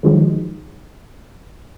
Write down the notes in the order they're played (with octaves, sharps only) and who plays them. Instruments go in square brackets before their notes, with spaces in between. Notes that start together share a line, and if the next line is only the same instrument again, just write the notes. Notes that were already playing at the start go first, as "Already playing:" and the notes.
[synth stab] D3 D#3 F3 F#3 G#3 D#4